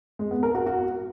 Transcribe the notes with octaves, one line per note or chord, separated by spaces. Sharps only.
G#3
B3
A#4
F#4
F#4